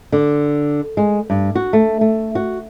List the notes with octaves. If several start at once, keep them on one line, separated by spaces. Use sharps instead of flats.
D3
G#3
G2
F#4
A3
A3
F#4